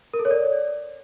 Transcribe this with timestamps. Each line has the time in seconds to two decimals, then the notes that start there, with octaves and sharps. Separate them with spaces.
0.14 A#4
0.19 A4
0.25 C#5
0.31 D5